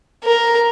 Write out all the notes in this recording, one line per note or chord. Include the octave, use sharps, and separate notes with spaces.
A#4